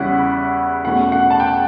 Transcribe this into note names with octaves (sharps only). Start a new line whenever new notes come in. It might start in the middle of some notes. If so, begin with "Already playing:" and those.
Already playing: E2 C#3 G3 C#4 E4 F#5
E2 B2 A3 C#4 F#5
F#5
A5
G5